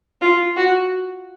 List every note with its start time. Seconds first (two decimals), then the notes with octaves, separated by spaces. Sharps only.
0.21 F4
0.57 F#4